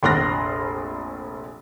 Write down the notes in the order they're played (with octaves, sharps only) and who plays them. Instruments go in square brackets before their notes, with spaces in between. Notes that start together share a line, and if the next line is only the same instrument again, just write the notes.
[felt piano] F1 A#1 C6 F6 F#6 A#6